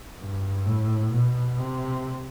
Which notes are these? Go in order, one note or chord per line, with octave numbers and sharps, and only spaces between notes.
G2
A2
B2
C3